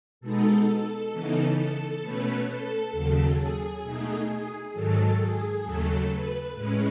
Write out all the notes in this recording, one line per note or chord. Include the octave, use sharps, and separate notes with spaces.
B2 G#3 B3 D#4 A4
C#3 E3 B3 D#4
A4
B2 A3 C#4 B4
A4
D#2 C#3 F#3 A4
G#4
B2 A3 D#4
G#2 D#3 F#3 A4
G#4
D#2 C#3 F#3 A3 A4
B4
A2 G#3 C#4